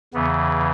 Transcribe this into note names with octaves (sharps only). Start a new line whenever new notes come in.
E2 C#3 E3 B3